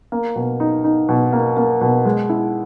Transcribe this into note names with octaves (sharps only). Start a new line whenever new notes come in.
A#3
B2
D#4
D#4
B2
A#3
A#3
B2
G#3
E4